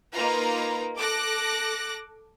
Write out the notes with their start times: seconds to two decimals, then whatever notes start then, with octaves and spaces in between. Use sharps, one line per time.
0.15 A#3 D#4 F4 B4 A#5
0.96 A4 D6 F#6 A#6